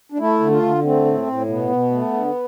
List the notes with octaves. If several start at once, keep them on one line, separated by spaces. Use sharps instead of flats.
D4
A3 E4
D3
F4
D3
A3 C4
A2
A2
B2 B3
B2
A3
D3